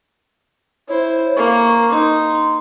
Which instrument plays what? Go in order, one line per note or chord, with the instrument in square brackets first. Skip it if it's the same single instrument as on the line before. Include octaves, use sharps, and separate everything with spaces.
[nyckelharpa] E4 C5 [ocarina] C#5
[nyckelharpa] A#3 [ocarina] C#6
[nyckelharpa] D#4 [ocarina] C6